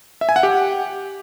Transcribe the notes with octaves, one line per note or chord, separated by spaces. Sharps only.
E5
G#5
F#5
G4